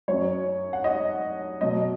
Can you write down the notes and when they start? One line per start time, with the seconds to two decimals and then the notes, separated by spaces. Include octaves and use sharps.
0.08 F#2 F#3 C#5
0.73 F#5
0.84 D#5
1.61 B2 F#3 D#5